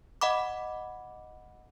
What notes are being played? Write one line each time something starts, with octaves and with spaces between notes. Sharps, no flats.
D#5 F#5 B5 D6